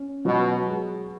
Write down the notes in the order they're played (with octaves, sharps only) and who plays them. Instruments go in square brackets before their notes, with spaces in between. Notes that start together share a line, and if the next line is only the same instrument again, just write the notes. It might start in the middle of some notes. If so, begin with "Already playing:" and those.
Already playing: [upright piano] C#4
[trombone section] B2 [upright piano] F#3
[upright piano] G#3